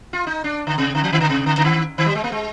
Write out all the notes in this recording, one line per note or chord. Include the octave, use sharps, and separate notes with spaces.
F4
D#4
D4
D3
C3
D3
F3
D#3
D3
C3
D3
D3
D#3
D#3
G3
G#3
A#3
G#3